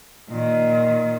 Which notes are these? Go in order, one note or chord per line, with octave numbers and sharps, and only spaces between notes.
A#2 D#3